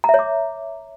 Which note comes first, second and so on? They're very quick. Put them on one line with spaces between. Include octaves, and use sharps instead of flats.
A#5 E5 C#5 D6